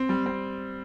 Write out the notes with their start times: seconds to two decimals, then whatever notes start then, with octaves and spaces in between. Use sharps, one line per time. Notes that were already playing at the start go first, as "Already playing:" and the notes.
Already playing: C4
0.09 G3
0.26 C4